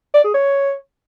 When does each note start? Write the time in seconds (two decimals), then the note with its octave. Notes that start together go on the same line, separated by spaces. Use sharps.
0.14 D5
0.24 G#4
0.34 C#5